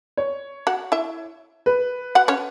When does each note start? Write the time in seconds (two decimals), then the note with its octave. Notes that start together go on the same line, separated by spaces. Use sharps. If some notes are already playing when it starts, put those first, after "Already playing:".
0.17 C#5
0.67 F#4 F#5
0.92 E4 E5
1.66 B4
2.15 F#4 F#5
2.28 C#4 C#5